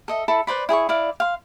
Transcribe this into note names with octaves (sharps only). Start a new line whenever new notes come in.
A4 D#5 E5
E4 A4 B5
B4 C5 D5 B5
E4 G#4 G#5 C#6
E4 D5 F5
F5 C6